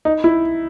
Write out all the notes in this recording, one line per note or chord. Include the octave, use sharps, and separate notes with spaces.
D#4
E4